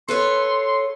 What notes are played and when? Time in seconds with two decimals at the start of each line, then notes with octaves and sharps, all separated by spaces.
0.08 A4 B4 C#5 C6